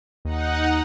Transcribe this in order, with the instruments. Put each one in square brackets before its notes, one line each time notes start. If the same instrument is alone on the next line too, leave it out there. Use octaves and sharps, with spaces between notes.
[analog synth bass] D#2 [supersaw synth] D#4 F#5